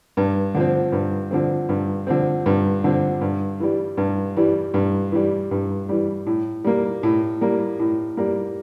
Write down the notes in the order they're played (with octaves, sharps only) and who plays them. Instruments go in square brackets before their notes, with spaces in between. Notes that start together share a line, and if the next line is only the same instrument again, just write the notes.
[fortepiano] G2
D3 F3 C4
G2
D3 F3 C4
G2
D3 F3 C4
G2
D3 F3 C4
G2
E3 G3
G2
E3 G3
G2
E3 G3
G2
E3 G3
A2
G3 A#3
A2
G3 A#3
A2
G3 A#3